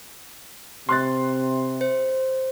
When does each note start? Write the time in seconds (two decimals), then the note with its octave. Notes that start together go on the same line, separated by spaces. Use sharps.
0.89 C3 C6 F#6 A6
1.81 C5